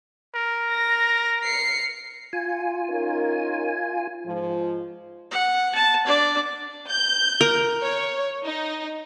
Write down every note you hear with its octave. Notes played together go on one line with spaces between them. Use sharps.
A#4
A#6
C7 C#7
F4 G#5
C#4 D#4 A#4
G#2 F3
F#5
A5
D4 D5
G6
A#4
C#5
D#4